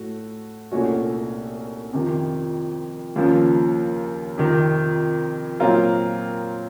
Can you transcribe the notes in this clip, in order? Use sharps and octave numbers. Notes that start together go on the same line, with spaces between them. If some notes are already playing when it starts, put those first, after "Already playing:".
Already playing: A2 A3 F#4
C2 A#2 A3 C#4 F#4
F2 C3 D#3
D#2 C#3 F3
F2 C3 D#3
A#2 F#3 C4 F4 A#4